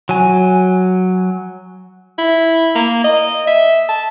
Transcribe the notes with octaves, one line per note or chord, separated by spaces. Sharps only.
F#3 G#5
E4
A#3
D#5
E5
A5